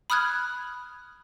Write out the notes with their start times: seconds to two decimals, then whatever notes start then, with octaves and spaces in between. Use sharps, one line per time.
0.10 B5 D#6 F6 F#6 G#6